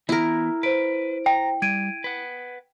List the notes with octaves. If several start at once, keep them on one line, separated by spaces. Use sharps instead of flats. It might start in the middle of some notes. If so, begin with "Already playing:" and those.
E3 B3 E4 A#4
B4 C5 D7
G5 A#5
G3 G#6 D7 D#7
B4 F#5